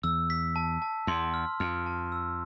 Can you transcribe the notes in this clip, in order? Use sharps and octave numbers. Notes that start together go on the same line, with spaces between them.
E2 E6
B6
A5
A5
E2 C6
F6
F2 F6
A5
E6